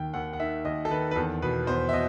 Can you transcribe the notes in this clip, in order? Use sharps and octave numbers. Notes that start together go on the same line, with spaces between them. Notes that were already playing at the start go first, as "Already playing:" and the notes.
Already playing: D#2 D#3 G5
D#2 F#5
F#5
D#3 E5
D#2 D#5
A4
D#3 B4
B4
E2 A4
B2 B4
E2 C5
E5
B2 D#5